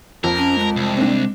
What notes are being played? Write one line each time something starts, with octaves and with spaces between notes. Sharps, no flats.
F2 A#4
C#4
G#3
C2
C4 D4